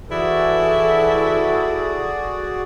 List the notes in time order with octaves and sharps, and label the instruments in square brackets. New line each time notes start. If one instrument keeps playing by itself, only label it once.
[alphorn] E3 [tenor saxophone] E4 [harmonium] F#4 G#4 D5 [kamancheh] A4